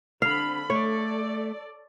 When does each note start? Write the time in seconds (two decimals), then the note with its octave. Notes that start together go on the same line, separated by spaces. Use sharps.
0.22 D3 C4 F5 B5
0.70 A3 A4 C#5 D5